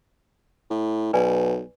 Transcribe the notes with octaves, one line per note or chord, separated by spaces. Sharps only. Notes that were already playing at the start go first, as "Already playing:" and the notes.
A2
B1 B4 D5 G#5